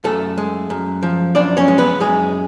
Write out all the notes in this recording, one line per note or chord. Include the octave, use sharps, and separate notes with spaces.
F#2 A3 A4
G#3
F#2
F3
F#2 D4 D5
C#4 C#5
G#3
B3 B4
F#2 G#3 G#4